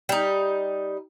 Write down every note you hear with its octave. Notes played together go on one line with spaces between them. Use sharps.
G3 D#4